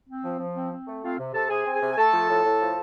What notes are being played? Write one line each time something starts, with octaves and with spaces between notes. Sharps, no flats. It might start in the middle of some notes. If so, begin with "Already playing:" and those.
C4
F3
F3
C4
C4
A3
C4 F4 F5
C3
C3 A4 A5
C3 G#4 G#5
C4
G#4 G#5
C3
G#5
A3 A4 A5
F3
A2
A2
F3